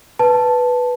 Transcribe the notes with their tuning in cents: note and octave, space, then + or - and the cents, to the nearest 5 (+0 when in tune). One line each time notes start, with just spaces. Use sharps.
B4 +0 A5 +0